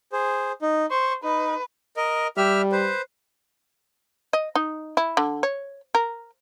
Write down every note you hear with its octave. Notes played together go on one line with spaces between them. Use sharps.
G#4 C5
D#4
C5 C#6
D#4 B4
A#4 D#5
G3 G4 E5 F6
B4 C5
D#5
D#4
E4
D3
C#5
A#4